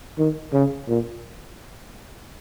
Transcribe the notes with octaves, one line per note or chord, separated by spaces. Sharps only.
D#3
C#3
A#2